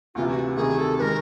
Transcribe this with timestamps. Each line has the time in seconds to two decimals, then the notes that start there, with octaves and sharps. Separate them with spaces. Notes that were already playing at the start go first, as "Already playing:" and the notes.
0.15 D2 C3 E3 F4
0.29 F#4
0.56 D2 C3 D#3 G#4
0.78 A4
0.98 D#3 G#3 A#4 B4